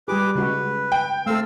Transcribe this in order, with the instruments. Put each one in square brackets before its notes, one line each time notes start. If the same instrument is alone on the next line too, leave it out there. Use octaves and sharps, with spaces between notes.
[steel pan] G3 G4 G#4 [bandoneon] B4 D6
[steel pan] C#3 G#3 F#4 [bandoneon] B4
[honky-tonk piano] G5
[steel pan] A3 A4 [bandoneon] C4 F5 E6